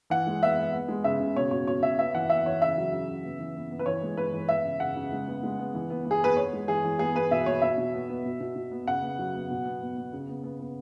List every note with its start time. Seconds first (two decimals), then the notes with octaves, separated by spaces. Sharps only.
0.10 E3 F#5
0.27 G#3
0.43 B3 E5
0.58 B3
0.73 B3
0.88 G#3
1.04 C#3 E5
1.20 C#3
1.36 B2 C#5
1.51 B2 C#5
1.67 B2 C#5
1.83 B2 E5
1.99 B3 E5
2.15 E3 F#5
2.30 B3 E5
2.45 E3 C#5
2.62 C#3 E5
2.77 F#3
2.93 C#3
3.08 C#3
3.24 B3
3.39 E3
3.56 B3
3.71 B3
3.79 B4
3.86 E3 C#5
4.02 G#3
4.17 G#3 B4
4.33 E3
4.48 B3 E5
4.65 C#3
4.80 C#3 F#5
4.96 C#3
5.12 G#3
5.27 B3
5.43 G#3
5.59 B3
5.74 E3
5.90 B3
6.05 B3
6.11 G#4
6.21 B3 B4
6.37 B3 C#5
6.53 G#3
6.68 E3 G#4
6.84 E3
6.99 B3 G#4
7.16 B3 B4
7.31 B2 E5
7.46 B2 C#5
7.62 B2 E5
7.78 B2
7.94 B3
8.09 B3
8.25 B2
8.40 B2
8.56 B2
8.71 B3
8.87 C#3 F#5
9.02 B3
9.18 F#3
9.35 B3
9.50 B2
9.65 B3
9.81 B3
9.97 B3
10.13 C#3
10.28 B3
10.44 B3
10.60 B3